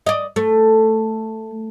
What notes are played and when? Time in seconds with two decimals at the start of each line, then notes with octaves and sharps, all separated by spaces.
0.06 D5 D#5
0.36 A3